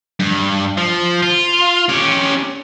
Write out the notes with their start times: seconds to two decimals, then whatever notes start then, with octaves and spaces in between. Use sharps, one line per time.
0.20 G2
0.78 F3
1.23 F4
1.89 C#4 G4